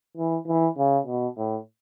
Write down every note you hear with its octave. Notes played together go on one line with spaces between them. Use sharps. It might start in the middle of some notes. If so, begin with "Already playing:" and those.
E3
E3
C#3
B2
A2